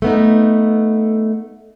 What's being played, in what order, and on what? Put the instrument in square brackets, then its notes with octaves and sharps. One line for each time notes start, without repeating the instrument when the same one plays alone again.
[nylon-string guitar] A3 B3 D#4